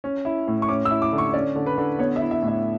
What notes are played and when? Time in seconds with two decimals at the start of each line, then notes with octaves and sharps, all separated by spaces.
0.04 C#4
0.25 E4
0.47 A2
0.62 C#6
0.69 C#4 D6
0.85 E6
0.91 E4
1.02 D6
1.12 D3
1.18 C#6
1.33 C#4 D5
1.56 D3
1.66 B4
1.78 D3
1.98 B3 C#5
2.16 E5
2.21 E4
2.31 E5
2.42 A2
2.48 E5